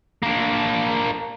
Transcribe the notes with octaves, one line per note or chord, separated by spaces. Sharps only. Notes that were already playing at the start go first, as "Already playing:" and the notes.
A#3 D4